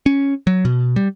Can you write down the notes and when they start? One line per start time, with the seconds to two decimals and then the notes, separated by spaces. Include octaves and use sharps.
0.06 C#4
0.47 F#3
0.65 B2
0.96 G3